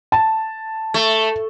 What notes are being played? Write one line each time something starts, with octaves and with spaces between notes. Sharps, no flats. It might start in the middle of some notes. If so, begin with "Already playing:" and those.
A5
A3